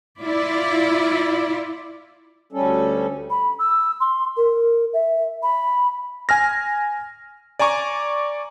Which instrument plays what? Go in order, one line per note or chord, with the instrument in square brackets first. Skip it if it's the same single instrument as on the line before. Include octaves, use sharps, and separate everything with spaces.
[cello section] E4 F4 D5
[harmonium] D2 G3 C#4 A4
[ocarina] B5
E6
C6
A#4
E5
B5
[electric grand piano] G#5 F6 A#6
D5 G#5 A#5 C#6 D6